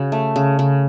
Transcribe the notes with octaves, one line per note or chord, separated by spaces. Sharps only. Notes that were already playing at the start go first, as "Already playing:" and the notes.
Already playing: C#3 F#4
A3
C#3
C#3